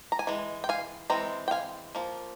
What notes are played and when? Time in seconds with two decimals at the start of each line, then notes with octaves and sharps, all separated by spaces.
0.12 A#5
0.19 G#5
0.27 E3 G#3
0.64 G5
0.69 F5 G#5
1.10 E3 G#3 C4 A#5
1.48 G5
1.51 F5 G#5
1.95 F3 A#3